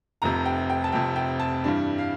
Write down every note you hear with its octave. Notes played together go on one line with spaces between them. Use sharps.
F1 F2 C3 A#5
G5
G5
A5
F1 F2 C3 G5
G5
A5
G2 E3 G3 D4
F5